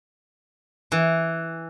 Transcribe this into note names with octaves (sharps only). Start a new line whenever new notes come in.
E3